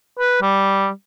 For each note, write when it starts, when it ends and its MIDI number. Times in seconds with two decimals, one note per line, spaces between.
0.19 0.37 71
0.42 0.90 55